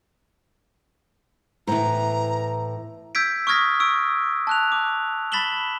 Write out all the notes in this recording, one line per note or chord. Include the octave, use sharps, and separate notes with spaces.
A2 E3 B3 B4 C5 A#5
E6 G6 G#6 B6 D7
C#6 D#6 F6 G#6 A#6 B6
C#6 E6 D7
A5 F#6 F7
D6
B5 A6 B6 E7 F#7 G7